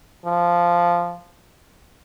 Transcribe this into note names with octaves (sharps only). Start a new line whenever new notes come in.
F3